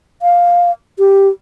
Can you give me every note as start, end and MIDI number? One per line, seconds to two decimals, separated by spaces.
0.22 0.71 77
0.99 1.28 67